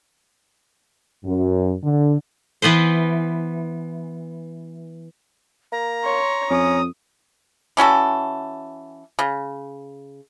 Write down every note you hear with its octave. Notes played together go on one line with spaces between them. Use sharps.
F#2
D3
E3 B3 B4 C5
A#3 A#5
C#5 C6
F2 C#4 D#6
E3 C#4 F#4 A4
C#3